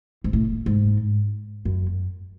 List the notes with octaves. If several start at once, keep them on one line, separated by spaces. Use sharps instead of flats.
G#2
A2
G#2
F#2